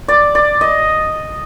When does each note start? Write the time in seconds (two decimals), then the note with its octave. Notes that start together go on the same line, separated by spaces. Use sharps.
0.08 D5
0.35 D5
0.61 D#5